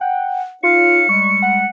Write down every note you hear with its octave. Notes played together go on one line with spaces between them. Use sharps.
F#5 G5
D#4 F4 C#5 F5 C#7
G3 G#3 C#6
F#5